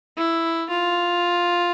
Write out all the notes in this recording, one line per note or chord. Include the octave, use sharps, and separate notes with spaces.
E4
F4